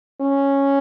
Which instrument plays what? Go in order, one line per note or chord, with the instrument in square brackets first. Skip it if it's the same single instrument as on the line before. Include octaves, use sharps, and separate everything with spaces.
[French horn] C#4